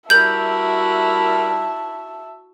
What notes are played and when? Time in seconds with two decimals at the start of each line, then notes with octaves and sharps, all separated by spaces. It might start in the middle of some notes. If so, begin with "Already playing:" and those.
0.10 G3 E4 F#4 A#4 E5 A5 G6 F#7